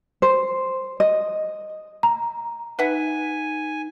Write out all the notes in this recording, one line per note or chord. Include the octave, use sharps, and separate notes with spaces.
C5
D#5
A#5
D#4 B4 E5 F#5 G#5